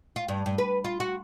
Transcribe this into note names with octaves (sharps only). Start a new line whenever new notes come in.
F4
G2
G2
B4
F4
F#4